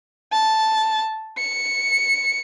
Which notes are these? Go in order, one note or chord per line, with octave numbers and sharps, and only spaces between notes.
A5
C#7